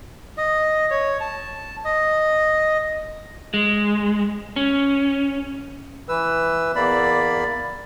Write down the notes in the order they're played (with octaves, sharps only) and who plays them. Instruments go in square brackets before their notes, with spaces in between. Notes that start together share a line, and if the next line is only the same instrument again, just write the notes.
[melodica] D#5
C#5
A5
D#5
[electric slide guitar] G#3
C#4
[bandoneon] E3 B4 E6
E2 A#3 D5 B5